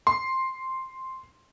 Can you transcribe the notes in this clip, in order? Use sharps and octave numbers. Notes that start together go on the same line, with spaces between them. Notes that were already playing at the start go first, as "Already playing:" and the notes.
C6